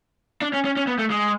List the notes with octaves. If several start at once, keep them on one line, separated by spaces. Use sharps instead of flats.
D4
C#4
C#4
C#4
B3
A3
G#3